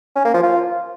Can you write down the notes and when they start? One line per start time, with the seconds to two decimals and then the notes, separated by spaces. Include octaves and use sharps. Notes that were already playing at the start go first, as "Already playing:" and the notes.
0.16 C#4
0.25 A#3
0.34 F3
0.43 F4